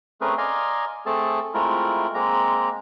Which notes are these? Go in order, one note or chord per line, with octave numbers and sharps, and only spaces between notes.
A3 C4 C#4 G#4 A#4 B4
D5 D#5 F5 G#5 A#5 C6
A3 C4 G#4 A4 A5
G#3 A3 C4 E4 F4 A#4
G#3 A#3 C4 A#5